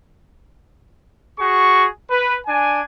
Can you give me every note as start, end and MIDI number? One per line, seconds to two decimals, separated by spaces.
1.39 1.85 66
1.39 1.85 68
1.39 1.85 85
2.10 2.36 71
2.47 2.80 62
2.47 2.80 80